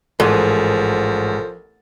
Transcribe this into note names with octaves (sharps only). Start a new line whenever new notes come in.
A1 G#2 F3 A4 A#4